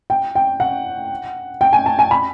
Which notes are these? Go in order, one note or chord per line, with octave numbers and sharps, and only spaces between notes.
G5
G5
F#5
G5
G#5
A5
G#5
B5